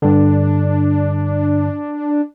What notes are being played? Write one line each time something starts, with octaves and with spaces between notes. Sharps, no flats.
G2 D3 D4